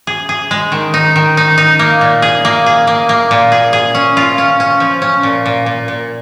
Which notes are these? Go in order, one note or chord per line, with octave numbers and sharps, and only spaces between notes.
G#4
G#4
G#3
D#3
D#4
D#3
D#4
D#4
A#3
A#2
G#4
A#3
G#4
A#3
A#3
A#2
G#4
G#4
C#4
F4
C#4
C#4
F3
C#4
A#2
A#2
A#2
A#2